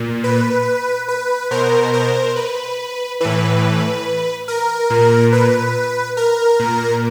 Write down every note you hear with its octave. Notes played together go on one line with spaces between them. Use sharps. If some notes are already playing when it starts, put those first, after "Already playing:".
Already playing: A#2
B4
B4
B2 A#4 C5
A#4 C5
B4
A2 E3 B4
A#4
A#2
B4
A#4
A#2